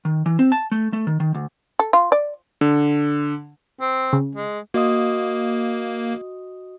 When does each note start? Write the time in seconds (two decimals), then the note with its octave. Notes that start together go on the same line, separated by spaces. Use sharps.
0.05 D#3
0.26 E3
0.39 C4
0.52 A5
0.72 A3
0.93 A3
1.07 D#3
1.20 D#3
1.34 D2
1.79 A4
1.93 F4
2.12 D5
2.61 D3
3.81 C4
4.13 C#3
4.35 G#3
4.74 A#3 F#4 D#5 D#6